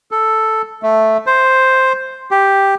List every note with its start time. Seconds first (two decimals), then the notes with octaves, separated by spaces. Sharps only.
0.11 A4
0.83 A3
1.26 C5
2.31 G4